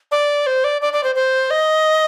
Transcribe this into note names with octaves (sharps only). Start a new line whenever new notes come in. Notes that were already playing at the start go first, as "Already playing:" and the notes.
D5
C5
D5
D5
D5
C5
C5
D#5